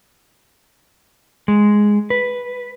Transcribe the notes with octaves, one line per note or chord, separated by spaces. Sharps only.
G#3
B4